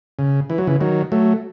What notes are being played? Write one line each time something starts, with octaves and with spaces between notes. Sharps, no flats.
C#3
E3
F#3
C#3 E3
D#3 F#3
F#3 A3